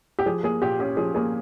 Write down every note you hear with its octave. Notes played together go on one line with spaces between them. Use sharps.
G4
F3 G#4
A#3 G#4
A#2 G4
C#4 G4
F3 G#4
A#3 G#4